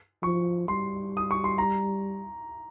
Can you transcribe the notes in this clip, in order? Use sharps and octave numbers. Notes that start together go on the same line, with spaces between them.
F3 C#6
G3 C6
D#6
C#6
C6
A#5